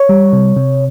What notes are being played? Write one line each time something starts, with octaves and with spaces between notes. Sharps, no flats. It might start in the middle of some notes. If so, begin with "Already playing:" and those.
Already playing: C#5
G3
C3
C3